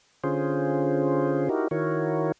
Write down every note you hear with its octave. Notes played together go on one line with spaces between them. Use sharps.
D3 C#4 F4 G#4 C5
D#4 E4 F#4 G4 A#4
D#3 E4 F#4 A#4 C#5